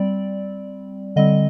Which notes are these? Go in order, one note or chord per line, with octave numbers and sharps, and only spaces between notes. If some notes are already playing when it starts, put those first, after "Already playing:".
Already playing: G3 C4 D5
D3 G3 C4 D#5